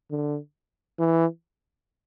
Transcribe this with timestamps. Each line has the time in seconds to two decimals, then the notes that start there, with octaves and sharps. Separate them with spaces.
0.11 D3
0.99 E3